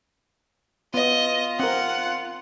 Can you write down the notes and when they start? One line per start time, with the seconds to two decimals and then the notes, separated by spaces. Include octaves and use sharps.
0.94 B3 F4 D#5
1.59 C4 A#4 F#5